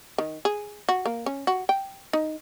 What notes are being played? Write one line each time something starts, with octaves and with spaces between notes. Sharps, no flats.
D#3
G#4
F#4
A#3
C#4
F#4
G5
D#4